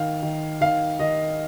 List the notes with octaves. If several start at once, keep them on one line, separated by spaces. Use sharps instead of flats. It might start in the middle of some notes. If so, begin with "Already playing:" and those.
Already playing: D#3 F5
D#3
D#3 F5
D#3 D#5